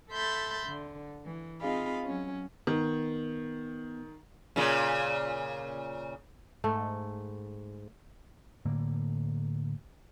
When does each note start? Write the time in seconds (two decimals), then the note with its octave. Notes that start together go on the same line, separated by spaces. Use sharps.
0.11 A4 E5 B5 C6 G6 A6
0.67 D3
1.25 E3
1.60 C4 D#4 F4 G#4 F5 B5
2.03 F#3 C#4
2.67 D#3 B3
4.56 A#2 C#3
6.64 G#2 A3
8.66 A2 D3 A#3